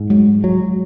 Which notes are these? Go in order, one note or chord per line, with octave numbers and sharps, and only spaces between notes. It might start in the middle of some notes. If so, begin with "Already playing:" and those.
Already playing: G#2
F#3 G#3
F#3